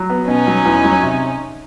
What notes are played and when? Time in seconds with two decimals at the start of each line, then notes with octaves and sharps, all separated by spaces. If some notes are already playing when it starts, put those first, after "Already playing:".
Already playing: F#3
0.10 B3
0.28 B2 C#4 D#4
0.47 F#3
0.65 E2
0.84 F#3
1.02 C3